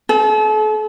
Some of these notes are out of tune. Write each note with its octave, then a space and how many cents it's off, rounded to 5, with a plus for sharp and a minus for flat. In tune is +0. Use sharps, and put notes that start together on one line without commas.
A4 -40